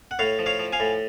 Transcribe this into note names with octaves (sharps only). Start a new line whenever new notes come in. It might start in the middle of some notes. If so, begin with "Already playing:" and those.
F#5
A2 C#5 F5
F3
C#5 F5
F3
F5 G#5
A2